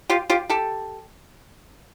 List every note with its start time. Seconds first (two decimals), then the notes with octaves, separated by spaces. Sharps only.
0.10 F4 G4
0.30 F4 G4
0.50 G4 A4